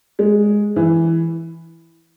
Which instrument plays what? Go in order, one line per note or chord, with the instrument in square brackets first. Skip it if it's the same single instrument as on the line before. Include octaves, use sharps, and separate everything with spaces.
[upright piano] G#3
E3